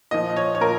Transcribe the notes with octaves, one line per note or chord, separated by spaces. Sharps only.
A#2 F3 D#5
C#5
C#5
A#2 A#4